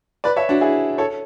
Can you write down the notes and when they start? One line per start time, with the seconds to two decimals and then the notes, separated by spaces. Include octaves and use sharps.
0.24 B4 D5
0.36 C#5 E5
0.49 D4 F#4
0.61 E4 G#4
0.98 A4 C#5